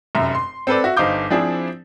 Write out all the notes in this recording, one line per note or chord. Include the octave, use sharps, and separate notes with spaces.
F1 F#2 E5 A#5
C6
C4 A4 B4 D5
F#4 E5
G1 D#4 C5 F5 D6 G6
F3 C4 D4 E4 G#4